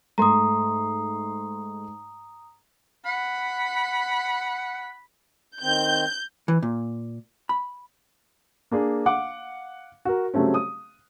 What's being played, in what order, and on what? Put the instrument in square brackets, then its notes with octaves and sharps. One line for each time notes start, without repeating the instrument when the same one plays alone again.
[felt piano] G#2 A3 C6 [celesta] A#5 D#6
[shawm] F#5 [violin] B5
[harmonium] D#3 C4 [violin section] G6
[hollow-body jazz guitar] E3
A#2
B5
[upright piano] A#3 D4 G#4
F5 F#5 D6
F#4 A#4
C#3 F#3 G3 A3 C4 C#4
D#6